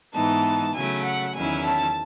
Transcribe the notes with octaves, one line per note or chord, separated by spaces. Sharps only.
G#2 E3 B3 D#4 A5
C#3 F#3 A3 G#5
F#5
E2 D#3 F#3 C#4 E4 G#5
A5